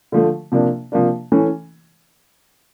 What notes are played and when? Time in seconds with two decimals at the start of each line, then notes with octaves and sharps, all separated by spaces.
0.12 D3 F3 A3
0.52 C3 F3 A#3 D4
0.92 C3 F3 A#3 D4
1.32 E3 A3 C#4